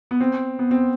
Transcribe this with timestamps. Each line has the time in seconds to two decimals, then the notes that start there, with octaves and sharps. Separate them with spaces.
0.11 B3
0.21 C4
0.59 B3
0.71 C4